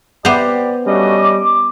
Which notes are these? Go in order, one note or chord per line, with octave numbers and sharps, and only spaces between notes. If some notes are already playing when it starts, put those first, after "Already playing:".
B3 G4 C5 D5
G3 A3 C#4 D4 F#4 D#5
D6